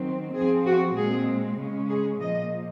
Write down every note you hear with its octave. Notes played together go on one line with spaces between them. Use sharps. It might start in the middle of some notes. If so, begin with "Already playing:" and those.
Already playing: D#3 F#3 C4
F3 C4 G#4
F#4
A#2 G#3 C4 G#4
C#3 G#3 C#4
G#4
A#2 F3 A#3 D#5